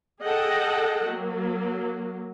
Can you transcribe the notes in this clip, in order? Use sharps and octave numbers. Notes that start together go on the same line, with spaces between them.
G#4 A4 D#5 F#5 G5 A5
F#3 A#3